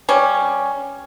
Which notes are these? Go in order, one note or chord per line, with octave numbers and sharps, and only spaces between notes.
G3 C#4